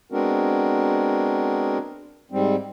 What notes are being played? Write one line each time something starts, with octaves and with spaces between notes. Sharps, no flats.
G#3 B3 C4 D4 F#4 A#4
G#2 G3 C4